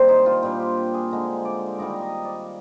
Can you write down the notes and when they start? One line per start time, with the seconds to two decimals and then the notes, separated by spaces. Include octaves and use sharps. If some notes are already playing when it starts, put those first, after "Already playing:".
Already playing: C3 D#3 G3 A#3 C4 C5
0.09 D#4
0.26 F4
0.43 A#2 G3 D4 F4
0.60 G4
0.94 G#4
1.11 D3 G#3 D#4
1.45 D5
1.79 D#3 G3 A#3 D#4 D5
2.02 D#5
2.25 D5